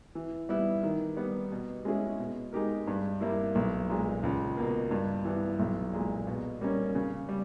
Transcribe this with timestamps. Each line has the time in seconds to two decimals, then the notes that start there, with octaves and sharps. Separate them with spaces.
0.15 E3
0.49 G3 B3 E4
0.83 D#3
1.17 G3 B3
1.52 B2
1.85 G#3 C#4 E4 G#4
2.19 B2
2.53 G#3 D#4 G4 A#4
2.87 G2
3.21 G3 A#3 E4
3.55 B1
3.89 A#2 G#3
4.23 C#2
4.57 B2 A#3
4.91 G2
5.25 E3 G3 B3
5.59 B1
5.93 A#2 G#3
6.27 B2
6.61 G3 A#3 C#4
6.95 C#3
7.29 G3